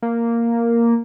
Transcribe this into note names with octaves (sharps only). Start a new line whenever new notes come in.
A#3